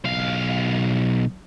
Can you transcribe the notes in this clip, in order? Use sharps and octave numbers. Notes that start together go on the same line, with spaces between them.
B1 F5